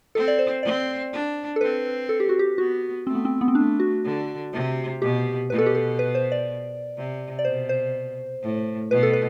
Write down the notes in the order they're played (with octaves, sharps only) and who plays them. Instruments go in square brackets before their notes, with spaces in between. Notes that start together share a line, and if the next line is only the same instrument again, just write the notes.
[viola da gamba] C4 [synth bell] A4
[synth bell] D5
C5
[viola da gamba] C4 [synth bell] D5
[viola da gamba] D4
[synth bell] A4
[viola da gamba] C4 [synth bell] B4
[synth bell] A4
G4
F#4
G4
[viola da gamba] B3 [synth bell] F#4
[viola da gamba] A3 [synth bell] C4
[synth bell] B3
C4
B3
C4
[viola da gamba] A3 [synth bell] D4
[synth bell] F#4
[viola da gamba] D3
C3
[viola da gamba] B2 [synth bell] G4
[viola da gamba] B2 [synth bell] B4
[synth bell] A4
G4
A4
B4
C5
D5
[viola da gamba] C3
[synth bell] D5
[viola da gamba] B2 [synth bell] C5
[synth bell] C5
[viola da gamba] A2
[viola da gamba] B2 [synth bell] B4
[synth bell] A4
B4